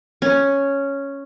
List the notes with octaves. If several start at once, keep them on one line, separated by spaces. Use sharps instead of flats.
C#4